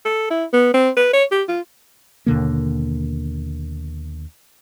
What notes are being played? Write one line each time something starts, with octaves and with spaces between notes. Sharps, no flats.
A4
E4
B3
C4
B4
C#5
G4
F4
D#2 B2 D3 A#3